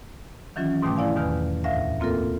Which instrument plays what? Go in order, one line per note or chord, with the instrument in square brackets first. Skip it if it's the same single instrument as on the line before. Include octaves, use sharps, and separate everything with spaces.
[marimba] D#3 E3 F#3 C#4 F4
G#2 B2 D#3 A3 G5 D6
E4 D5 F5 G#5
E2 B2 D#3 B4 F6
D2 A2 E5 F5 A#6
A#3 C4 F4 A4 A#4